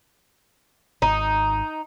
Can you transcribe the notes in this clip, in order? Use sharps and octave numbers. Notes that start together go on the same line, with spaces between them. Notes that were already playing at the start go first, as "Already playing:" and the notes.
G#1 D#4